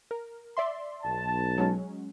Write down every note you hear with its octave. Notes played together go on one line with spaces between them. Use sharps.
A#4
D5 E5 C6
B1 A5
F#3 G#3 C#4